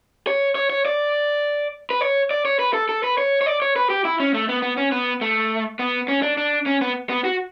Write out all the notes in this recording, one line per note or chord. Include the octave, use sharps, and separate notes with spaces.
C#5
C#5
C#5
D5
B4
C#5
D5
C#5
B4
A4
A4
B4
C#5
C#5
D5
C#5
B4
G4
E4
C#4
A3
B3
B3
C#4
B3
A3
B3
C#4
D4
D4
C#4
B3
B3
F#4